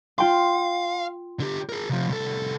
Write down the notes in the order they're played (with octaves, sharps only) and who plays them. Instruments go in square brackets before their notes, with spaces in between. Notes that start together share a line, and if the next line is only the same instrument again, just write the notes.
[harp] F4 G5 C6 [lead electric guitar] F5
[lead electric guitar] D3 G4
G#4 A#4
C3 F3
C2 A4